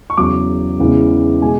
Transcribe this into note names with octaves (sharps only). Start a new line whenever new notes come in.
C#6
E2 C#3 F#3 D6
E2 C#3 E3 G#3
B2 G#3 G#5